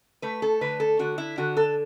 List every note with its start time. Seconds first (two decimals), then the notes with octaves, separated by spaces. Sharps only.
0.22 A3 B4
0.42 A4
0.61 D3 B4
0.80 A4
0.99 D3 F#4
1.18 E4
1.38 D3 F#4
1.57 A4